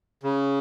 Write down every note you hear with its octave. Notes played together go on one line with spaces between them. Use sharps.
C#3